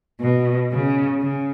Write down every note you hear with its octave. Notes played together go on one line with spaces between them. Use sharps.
B2
C#3
C#3